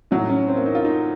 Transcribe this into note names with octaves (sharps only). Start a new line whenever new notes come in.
A2 F#3 D#4
C#4
C4
A#3
D#4
F4
D#4